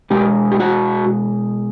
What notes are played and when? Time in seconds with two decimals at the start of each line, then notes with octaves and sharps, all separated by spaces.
0.10 B2 G#3 G4
0.52 G4
0.60 F#4